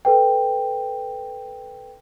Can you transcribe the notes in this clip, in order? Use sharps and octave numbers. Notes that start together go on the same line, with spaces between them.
A4 B4 G5